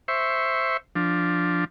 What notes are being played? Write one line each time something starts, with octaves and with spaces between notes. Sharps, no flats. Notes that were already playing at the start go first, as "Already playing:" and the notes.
C5 E5 C#6
F3 D4